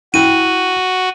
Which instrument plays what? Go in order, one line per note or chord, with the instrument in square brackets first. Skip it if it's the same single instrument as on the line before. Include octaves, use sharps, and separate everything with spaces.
[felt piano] E4 G5 [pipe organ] F#4 [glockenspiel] D#7